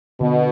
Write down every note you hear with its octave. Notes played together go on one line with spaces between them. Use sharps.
B2 D3